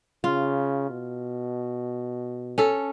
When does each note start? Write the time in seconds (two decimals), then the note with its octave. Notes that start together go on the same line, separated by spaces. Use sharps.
0.24 C#3 F4
0.90 B2
2.58 C#4 A4